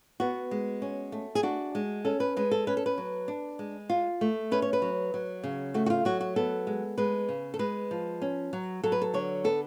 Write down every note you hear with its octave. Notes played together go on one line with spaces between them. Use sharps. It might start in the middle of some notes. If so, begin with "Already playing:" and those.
B3 F#4
G#3
C#4
A3
G#4
D4 F#4
G#3
C#4 A4
B4
G#3 B4
A4
C#4 B4
A4
B4
F#3
D4
G#3
F4
A3
C#4 B4
C#5
B4
F#3
F#3
C#3
A3 F#4
F#4
F4
F#3 F#4
F#4
B3 A4
G#3
G#3 B4
C#3
A4
G#3 B4
F3
C#4
F#3
F#3 A4
B4
A4
D3 C#5
B3 A4